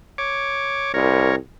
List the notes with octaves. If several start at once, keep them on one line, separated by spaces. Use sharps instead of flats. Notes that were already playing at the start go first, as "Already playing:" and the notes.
C#5 D6
C2 A#4 C#5